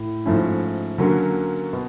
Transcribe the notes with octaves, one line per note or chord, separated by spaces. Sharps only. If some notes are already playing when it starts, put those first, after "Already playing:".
Already playing: A2
G#2 F3 A3 C#4 E4
D3 F#3 A#3 C#4 F#4
B2